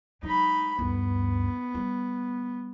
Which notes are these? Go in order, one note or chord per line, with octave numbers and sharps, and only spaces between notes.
F#3 G#3 D#4 B5
D2 G2 B3
G3